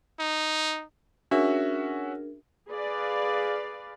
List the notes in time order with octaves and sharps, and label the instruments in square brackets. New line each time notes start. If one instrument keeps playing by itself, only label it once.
[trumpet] D#4
[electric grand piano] C#4 F#4 E5 [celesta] D4 G#4 A#4
[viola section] G#4 B4 D5 F5